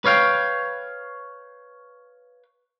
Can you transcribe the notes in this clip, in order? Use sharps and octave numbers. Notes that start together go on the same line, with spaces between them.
B4 C#5 F5 G5